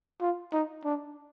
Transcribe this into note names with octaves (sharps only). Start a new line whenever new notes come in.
F4
D#4
D4